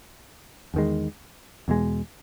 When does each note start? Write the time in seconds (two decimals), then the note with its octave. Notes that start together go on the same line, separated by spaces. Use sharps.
0.74 E2 D#3 G#3
1.68 E2 B2 G#3